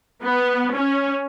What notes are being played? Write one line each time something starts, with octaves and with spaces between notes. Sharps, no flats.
B3
C#4